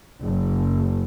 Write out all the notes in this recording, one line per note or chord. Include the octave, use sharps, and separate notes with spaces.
F#1